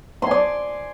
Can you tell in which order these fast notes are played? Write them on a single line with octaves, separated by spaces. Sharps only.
C6 G#5 D5